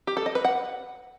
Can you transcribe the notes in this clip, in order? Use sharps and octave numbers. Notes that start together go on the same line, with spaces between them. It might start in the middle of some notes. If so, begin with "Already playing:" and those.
G4
A4
D#5
B4
F#5